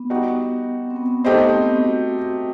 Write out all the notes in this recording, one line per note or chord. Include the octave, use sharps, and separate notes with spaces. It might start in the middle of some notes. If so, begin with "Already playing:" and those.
Already playing: B3
G3 D#4 F#4
C4
B3
A3 D#4 G4 C5 D#5
C4
B3
C4
F#4